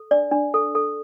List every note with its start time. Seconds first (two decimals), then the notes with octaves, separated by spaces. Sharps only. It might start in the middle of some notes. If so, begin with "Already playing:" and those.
Already playing: A4
0.11 D4 D5
0.32 D4
0.54 A4
0.75 A4